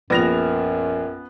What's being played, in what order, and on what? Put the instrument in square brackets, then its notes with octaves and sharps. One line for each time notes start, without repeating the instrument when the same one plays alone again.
[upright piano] A#1 A#6 F7 [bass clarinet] F#2 [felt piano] B3